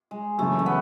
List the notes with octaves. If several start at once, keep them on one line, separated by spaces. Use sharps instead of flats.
G#3
F#2 C#3 E3 A3
A3
B3